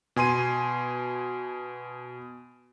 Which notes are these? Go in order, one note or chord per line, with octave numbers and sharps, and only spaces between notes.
B2 G#5 C6 D#7